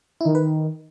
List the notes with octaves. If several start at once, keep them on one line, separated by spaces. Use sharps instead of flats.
E4
D#3 D#4
B4